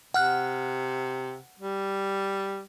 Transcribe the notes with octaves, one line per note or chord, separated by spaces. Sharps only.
C3 F#5 F6 F#6
G3